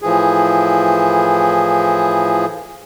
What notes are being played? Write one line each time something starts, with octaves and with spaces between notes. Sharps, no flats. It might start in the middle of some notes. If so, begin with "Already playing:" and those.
A2 E3 F3 G#4